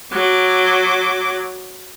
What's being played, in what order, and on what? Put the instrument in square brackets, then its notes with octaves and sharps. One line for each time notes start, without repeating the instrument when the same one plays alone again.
[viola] F#3 D6